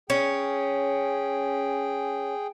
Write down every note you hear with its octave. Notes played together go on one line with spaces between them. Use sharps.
C#4 G#4 G5